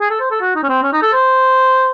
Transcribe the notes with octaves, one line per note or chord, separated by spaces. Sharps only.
G#4
A4
C5
A4
F#4
D#4
C#4
C4
C#4
D#4
A4
C5